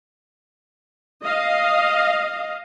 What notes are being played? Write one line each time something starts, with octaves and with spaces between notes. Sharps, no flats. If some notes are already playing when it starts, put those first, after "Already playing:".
D#5 F5